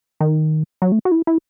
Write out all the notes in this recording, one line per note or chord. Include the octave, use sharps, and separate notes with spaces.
D#3
F#3
A3
F#4
E4
E4